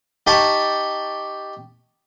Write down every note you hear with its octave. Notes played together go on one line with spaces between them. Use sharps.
D#4 G4 G5 A5 B5 C#6